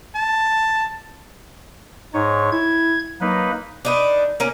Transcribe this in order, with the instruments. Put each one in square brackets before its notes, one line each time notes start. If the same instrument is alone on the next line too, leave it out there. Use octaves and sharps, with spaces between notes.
[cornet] A5
[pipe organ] G#2 C#5 [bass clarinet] D#4
[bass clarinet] E4 [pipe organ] G#6
[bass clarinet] F#3 [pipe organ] A#3 D#4 B4
[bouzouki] D4 D#4 B4
A#3 C#4